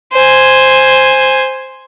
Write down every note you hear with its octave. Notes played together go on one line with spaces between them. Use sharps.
C5 G#5